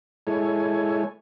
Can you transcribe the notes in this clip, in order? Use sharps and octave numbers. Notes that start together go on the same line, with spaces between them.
G#3 E4 A4 C#5 G#5